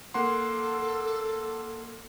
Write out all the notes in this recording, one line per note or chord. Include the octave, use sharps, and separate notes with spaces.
A#3 A4 F#5 C6